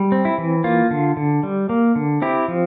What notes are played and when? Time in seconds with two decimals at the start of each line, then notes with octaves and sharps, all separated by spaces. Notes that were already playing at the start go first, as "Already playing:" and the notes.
Already playing: G3
0.12 C4
0.25 E4
0.38 E3
0.64 A#3 F4
0.91 D3
1.17 D3
1.43 G3
1.69 A#3
1.96 D3
2.22 C4 E4 G4
2.48 F3